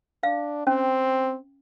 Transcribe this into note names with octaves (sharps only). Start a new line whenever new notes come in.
D4 F5
C4 C#4